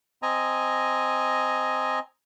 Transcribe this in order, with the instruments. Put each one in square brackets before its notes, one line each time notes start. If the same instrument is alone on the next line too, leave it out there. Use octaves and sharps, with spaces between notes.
[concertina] C4 D#5 G#5 A#5